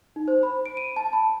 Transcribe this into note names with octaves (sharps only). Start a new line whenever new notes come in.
D#4
C5
B5
D7
D#7
A5
B5